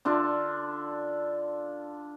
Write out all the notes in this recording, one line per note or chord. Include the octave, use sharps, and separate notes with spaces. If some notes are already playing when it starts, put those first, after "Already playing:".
D3 D4 F4 A4